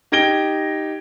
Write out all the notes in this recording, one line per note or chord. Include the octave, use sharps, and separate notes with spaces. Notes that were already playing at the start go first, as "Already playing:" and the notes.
D#4 G4 G#6 A#6 D7 G7